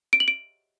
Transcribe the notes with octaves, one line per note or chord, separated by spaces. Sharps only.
D7
F#7
D7